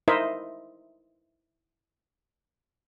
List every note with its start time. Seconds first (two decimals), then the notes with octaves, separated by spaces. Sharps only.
0.08 D#4 E4 A#4 C5 D#5 E5